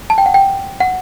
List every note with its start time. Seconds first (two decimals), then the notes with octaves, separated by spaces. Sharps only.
0.10 A5
0.18 G5
0.26 F#5
0.34 G5
0.80 F#5